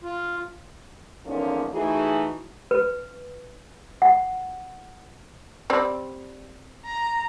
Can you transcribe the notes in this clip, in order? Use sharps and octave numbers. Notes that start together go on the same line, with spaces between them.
F4
E2 G#2 D3 F3 A#3 C#4
E3 A3 D#4 E4 F#4 G#4
B4
F#5
G3 C4 D5
A#5